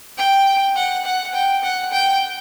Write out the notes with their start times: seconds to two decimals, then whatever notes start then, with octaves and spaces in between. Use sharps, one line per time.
0.18 G5
0.76 F#5
1.05 F#5
1.34 G5
1.63 F#5
1.92 G5